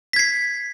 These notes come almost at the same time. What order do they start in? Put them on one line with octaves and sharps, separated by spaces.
B6 G#6 C7